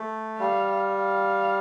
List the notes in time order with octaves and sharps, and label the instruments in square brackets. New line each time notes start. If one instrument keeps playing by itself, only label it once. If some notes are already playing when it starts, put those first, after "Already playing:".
Already playing: [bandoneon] A3
[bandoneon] G3 [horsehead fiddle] F5
[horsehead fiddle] F5